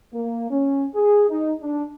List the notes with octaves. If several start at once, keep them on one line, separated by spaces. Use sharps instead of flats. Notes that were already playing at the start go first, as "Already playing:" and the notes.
A#3
C#4
G#4
D#4
D4